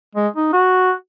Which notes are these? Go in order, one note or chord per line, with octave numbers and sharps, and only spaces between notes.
G#3
D#4
F#4